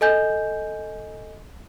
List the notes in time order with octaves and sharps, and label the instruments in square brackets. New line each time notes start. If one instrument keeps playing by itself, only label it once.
[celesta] A4 D#5 G#5 G6